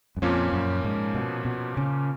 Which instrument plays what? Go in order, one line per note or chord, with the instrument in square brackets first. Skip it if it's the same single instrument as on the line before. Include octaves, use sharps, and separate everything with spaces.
[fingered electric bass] F#2
[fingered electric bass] F2 [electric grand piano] A#2 F3 A#3 C#4
[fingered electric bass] F#2
G#2
B2
B2
C#3